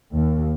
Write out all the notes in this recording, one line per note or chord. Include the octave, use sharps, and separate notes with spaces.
D#2